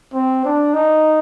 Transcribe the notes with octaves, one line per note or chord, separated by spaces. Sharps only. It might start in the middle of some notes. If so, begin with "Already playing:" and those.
C4
D4
D#4